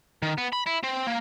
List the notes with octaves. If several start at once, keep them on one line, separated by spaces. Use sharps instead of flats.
D#3
B3
B5
E4
C4
A#3